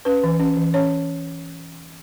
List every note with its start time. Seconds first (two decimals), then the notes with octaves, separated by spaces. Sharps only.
0.05 C#4 B4
0.23 E3
0.40 C#4
0.57 E3
0.74 C#4 C#5